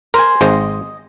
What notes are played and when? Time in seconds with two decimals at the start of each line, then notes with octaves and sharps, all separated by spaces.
0.14 A#4 C5 G#5
0.41 G#1 G#3 C5 D#5